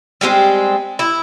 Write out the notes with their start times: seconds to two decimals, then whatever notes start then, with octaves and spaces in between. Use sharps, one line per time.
0.21 G3 G#3 A#3 C4
0.99 E4